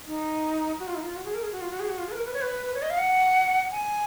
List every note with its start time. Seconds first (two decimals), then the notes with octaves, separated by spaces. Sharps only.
0.06 D#4
0.80 F#4
0.88 F4
0.95 D#4
1.02 F4
1.16 F#4
1.25 G#4
1.34 A#4
1.43 G#4
1.52 F#4
1.61 F4
1.70 F#4
1.80 G#4
1.89 F#4
1.98 F4
2.07 G#4
2.12 B4
2.16 A#4
2.25 B4
2.34 C#5
2.41 B4
2.66 B4
2.74 C#5
2.82 D#5
2.90 F5
2.98 F#5
3.71 G#5